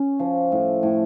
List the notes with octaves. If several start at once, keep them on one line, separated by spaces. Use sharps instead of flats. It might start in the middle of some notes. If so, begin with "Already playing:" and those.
Already playing: C#4
F3
A2
A2